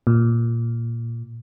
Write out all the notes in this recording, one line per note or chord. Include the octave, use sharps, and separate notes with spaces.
A#2